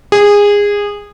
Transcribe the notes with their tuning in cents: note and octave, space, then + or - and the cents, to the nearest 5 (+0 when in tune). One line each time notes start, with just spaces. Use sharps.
G#4 -20